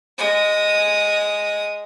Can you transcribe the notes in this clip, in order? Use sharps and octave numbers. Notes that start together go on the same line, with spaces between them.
G#3 D#6